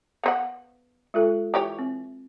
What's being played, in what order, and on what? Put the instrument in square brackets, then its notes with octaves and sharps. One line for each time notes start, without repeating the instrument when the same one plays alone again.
[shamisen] B3 C5 F#5 [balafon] F5
[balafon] G#3 F4 A4
[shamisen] E3 G4 C#5
[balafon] C4